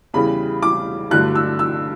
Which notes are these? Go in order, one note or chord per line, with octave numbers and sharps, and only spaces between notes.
E2 C#3 E3 G3 B5
D6
G2 D3 F#3 A3 F#6
E6
E6